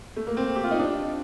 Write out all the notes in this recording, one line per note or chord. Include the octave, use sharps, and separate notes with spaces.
A3
A#3
C4
G4
F4
D#4
D4